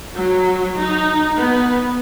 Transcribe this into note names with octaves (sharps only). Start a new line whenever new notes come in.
F#3
D#4
B3